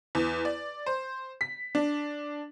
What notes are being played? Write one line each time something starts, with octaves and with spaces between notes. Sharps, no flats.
E2
D5
C5
B6
D4